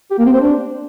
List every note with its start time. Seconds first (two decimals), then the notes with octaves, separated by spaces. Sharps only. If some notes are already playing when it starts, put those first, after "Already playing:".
0.11 G4
0.18 A#3
0.26 C4
0.33 C5
0.41 D4